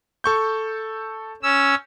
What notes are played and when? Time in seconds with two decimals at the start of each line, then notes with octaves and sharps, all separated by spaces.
0.24 A4 C#6 G6
1.43 C#4 E6